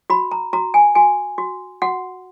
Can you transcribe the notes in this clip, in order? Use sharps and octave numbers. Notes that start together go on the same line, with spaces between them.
F#4 B5
A#5
F#4 A#5
G#5
F#4 G#5
F#4
F#4 F#5